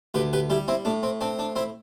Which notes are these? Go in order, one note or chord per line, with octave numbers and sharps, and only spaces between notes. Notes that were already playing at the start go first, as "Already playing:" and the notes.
D2 G4 B4
G4 B4
G3 E4 G4
C4 E4
A2 D4
C4
C4 D4
D4
C4 E4